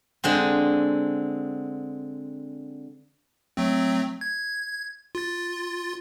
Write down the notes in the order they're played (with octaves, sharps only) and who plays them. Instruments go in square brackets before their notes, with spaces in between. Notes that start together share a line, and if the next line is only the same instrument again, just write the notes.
[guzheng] D3 G#3 C4
[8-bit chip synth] F#3 A3 C4
G#6
F4 A6